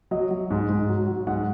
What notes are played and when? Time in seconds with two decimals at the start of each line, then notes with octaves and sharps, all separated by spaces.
0.11 F#3 D#5
0.31 F#3
0.50 G#2
0.69 G#2
0.89 F#3
1.08 F#3
1.27 G#2 F#5